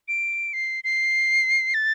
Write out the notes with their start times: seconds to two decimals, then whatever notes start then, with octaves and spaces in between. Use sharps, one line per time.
0.08 D7
0.53 C7
0.84 C7
1.74 A6